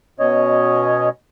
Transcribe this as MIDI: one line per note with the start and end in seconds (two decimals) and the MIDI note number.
0.20 1.09 47
0.20 1.09 61
0.20 1.09 73
0.20 1.09 75